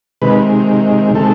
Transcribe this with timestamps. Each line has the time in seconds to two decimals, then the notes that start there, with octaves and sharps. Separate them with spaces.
0.22 C3 D#3 G#3 B4
1.15 C3 D#3 G#3 A4